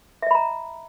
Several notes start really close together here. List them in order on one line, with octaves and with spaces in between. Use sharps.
E5 D#5 B5 A#5